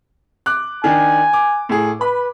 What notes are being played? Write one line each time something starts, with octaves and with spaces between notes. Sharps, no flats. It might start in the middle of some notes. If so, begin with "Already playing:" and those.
D6 F#6
D#3 D4 G#5
D6
A2 G#4
B4 B5